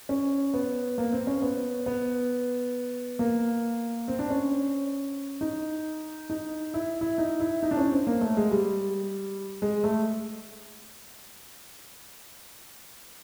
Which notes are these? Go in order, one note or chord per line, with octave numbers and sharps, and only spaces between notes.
C#4
B3
A#3
C4
C#4
B3
B3
A#3
C4
D4
C#4
D#4
D#4
E4
E4
D#4
E4
D#4
D4
C#4
C4
A#3
A3
G#3
G3
G#3
A3